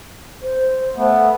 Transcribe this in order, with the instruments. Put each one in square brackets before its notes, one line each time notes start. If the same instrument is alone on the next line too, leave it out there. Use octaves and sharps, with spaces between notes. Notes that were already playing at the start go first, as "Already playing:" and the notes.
[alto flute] C5
[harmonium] A3 B3